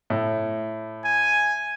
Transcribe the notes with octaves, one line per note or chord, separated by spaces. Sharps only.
A2
G#5